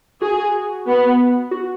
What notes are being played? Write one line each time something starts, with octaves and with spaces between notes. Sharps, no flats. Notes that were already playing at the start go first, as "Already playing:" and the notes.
F#4 G#4
B3
F#4